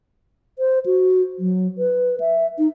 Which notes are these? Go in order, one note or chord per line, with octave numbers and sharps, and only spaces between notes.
C5
F#4
F#3
B4
E5
D#4